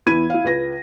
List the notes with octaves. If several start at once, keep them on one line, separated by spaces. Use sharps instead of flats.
E2 E3 E4 B5 G#6 D#7
E4 F5
C#2 B4 A#6